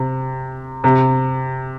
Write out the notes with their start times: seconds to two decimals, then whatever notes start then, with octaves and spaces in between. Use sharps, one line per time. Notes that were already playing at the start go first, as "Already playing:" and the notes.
Already playing: C3
0.84 C3